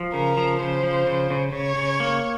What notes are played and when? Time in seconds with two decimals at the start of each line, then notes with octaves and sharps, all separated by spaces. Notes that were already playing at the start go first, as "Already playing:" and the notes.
Already playing: F3
0.14 C#3 A#4
0.37 F3
0.60 C#3 C5
0.83 F3
1.07 C#3
1.30 C#3
1.53 C#3 C#5
1.76 C#3
2.00 A#3